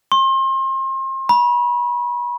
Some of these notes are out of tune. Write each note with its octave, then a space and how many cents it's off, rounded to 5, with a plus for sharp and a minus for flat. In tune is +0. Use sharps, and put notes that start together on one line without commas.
C6 +35
B5 -35